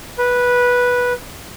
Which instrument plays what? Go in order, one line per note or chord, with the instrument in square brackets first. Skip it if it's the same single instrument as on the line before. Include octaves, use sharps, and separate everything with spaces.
[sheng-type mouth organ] B4